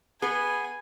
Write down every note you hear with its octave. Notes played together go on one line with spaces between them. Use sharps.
B3 G#4 B4 G#5